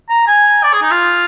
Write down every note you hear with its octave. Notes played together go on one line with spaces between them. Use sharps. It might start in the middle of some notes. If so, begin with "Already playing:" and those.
A#5
G#5
D5
G#4
D#4
F4